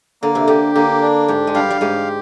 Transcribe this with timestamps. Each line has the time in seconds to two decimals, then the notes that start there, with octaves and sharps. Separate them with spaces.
0.22 D3 A#3
0.35 C3
0.47 D3 G4
0.75 D3 A#3
1.02 D4
1.28 G#2 G4
1.47 G#3
1.54 G2 G3 F5
1.70 G3
1.81 G#2 G#3 G4